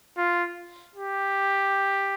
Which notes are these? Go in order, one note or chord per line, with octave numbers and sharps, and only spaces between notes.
F4
G4